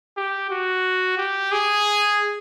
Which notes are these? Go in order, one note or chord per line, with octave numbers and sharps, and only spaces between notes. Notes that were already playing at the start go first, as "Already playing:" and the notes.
G4
F#4
G4
G#4